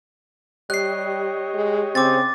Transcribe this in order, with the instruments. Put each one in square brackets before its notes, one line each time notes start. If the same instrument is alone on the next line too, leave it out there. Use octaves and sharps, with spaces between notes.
[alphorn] G3 [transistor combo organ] G4 C#5 D#5 [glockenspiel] F#6 C7
[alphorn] G#3
[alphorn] C#3 [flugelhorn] C4 [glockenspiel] D6 A6